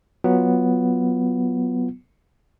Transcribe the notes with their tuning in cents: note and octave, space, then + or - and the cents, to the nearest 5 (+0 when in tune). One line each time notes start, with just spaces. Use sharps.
F#3 +0 B3 +0 F4 +0